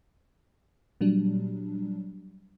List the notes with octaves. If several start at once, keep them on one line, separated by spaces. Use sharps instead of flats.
A#2 F#3 G3 D4